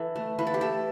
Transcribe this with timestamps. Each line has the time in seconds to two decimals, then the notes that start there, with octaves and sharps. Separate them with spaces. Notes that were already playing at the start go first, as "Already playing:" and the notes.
Already playing: E3 A4
0.16 A3
0.39 E3 B4
0.47 A4
0.54 G4
0.61 A3 A4